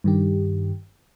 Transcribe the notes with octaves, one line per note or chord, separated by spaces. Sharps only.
G2 D#3 G4